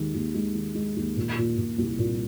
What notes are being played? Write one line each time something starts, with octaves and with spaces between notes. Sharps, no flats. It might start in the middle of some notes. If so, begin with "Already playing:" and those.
Already playing: D#2 D#3 G#3
D#2
G#3
D#3
G#3
D#2
A#2
A#2
A#2
C2
A#2